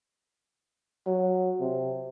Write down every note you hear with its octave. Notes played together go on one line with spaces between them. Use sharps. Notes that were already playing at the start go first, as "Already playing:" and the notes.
F#3
C3